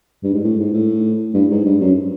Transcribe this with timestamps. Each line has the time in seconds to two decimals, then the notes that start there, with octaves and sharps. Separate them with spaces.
0.23 G2
0.34 G#2
0.44 A2
0.59 G#2
0.73 A2
1.34 G2
1.50 G#2
1.65 G2
1.81 F#2